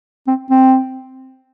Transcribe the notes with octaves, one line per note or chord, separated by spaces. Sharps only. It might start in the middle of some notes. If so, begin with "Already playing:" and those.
C4
C4